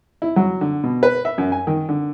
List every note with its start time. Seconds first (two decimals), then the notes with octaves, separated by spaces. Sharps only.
0.22 E4
0.36 F#3
0.61 D3
0.83 B2
1.03 B4
1.25 E5
1.38 F#2
1.52 G#5
1.67 D#3
1.89 D3